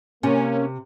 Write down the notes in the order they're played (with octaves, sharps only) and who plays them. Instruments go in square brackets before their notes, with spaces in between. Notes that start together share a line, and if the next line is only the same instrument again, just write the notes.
[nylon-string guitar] C3 [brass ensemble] A#3 [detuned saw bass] C#4